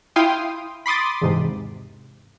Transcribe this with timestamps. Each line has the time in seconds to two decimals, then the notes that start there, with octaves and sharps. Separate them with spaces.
0.16 E4 F5 G5 C6 D#6
0.86 B5 C6 D6 D#6 A6
1.21 E2 G#2 C3